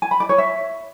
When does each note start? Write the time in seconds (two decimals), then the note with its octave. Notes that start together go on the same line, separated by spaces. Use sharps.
0.02 G#5
0.11 B5
0.20 D5
0.29 C#5
0.38 E5